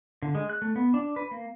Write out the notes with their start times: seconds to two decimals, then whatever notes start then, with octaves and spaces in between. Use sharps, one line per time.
0.22 D3
0.35 G#3
0.50 F#6
0.62 A3
0.76 B3
0.94 D4
1.16 B4
1.31 A#3